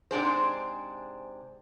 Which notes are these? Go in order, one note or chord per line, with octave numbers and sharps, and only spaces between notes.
G#2 C3 D4 G#4 C5